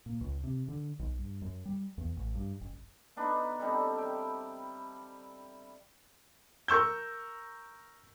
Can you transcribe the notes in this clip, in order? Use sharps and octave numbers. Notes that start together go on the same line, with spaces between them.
A#2
C#2
C3
D3
B1
G2
F#2
G3
E2
A1
G2
F#1
B3 D4 D#4 B4
G3 C4 D#4 A4
E5 G5 A5
A#4 C#6 E6 G6